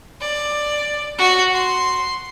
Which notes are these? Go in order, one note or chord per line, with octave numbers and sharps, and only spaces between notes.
D5
F#4
C6